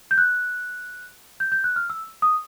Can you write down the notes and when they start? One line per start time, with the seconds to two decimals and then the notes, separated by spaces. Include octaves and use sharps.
0.11 G6
0.18 F#6
1.40 G6
1.52 G6
1.64 F#6
1.76 F6
1.90 E6
2.22 D#6